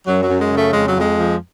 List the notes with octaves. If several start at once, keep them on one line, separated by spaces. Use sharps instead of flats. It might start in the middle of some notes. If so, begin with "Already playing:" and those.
F#2 F#3
F#3
F#2
G#3
C#3
A3
F2 G#3
F#3
F2 G#3
F3